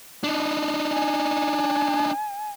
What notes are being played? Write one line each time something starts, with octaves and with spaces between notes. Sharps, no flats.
D4 D#4
G#5